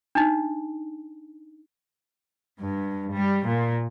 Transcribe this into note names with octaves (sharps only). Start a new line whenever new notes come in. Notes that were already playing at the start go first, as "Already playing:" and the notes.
D4 D#4
G2
G3
A#2